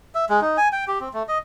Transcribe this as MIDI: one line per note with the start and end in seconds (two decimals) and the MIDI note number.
0.15 0.25 76
0.29 0.40 56
0.41 0.57 63
0.57 0.68 80
0.73 0.85 79
0.88 0.99 67
1.01 1.08 60
1.14 1.23 57
1.29 1.38 75